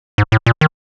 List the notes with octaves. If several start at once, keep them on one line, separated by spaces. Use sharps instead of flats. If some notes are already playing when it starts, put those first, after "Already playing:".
G#2
A2
A#2
D#3